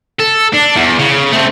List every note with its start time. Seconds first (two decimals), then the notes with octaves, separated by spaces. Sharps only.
0.20 A4
0.54 D4
0.76 E2
0.99 C#3
1.32 A3 C4